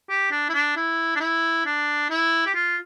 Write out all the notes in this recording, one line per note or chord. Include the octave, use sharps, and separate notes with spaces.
G4
D4
E4
D4
E4
D4
E4
D4
E4
G4
F4